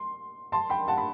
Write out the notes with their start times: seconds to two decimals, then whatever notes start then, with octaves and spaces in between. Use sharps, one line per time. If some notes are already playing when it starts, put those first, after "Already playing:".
Already playing: C6
0.52 A5 C6
0.70 G5 B5
0.88 F#5 A5
0.98 B5